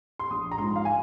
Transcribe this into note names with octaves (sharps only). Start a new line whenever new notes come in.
C6
A#1 D#6
A#5
G#2 F3 C6
F5
G#5